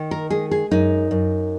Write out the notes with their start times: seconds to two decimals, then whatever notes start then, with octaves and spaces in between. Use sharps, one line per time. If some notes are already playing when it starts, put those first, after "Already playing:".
Already playing: D#3
0.11 A#4
0.30 G#3 G#4
0.51 G#4
0.71 F#2 D#4
1.11 F#2